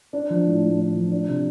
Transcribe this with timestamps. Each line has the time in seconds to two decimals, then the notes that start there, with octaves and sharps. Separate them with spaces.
0.13 D4
0.30 F3
0.46 A2
0.63 A2
0.79 D4
0.95 F3
1.12 D4
1.28 C3